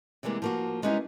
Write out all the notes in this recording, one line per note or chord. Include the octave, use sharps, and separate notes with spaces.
C3 E3 G3 G#3 A#3
F3 A#3 F#4
G3 G#3 B3 C#4 D#4 E4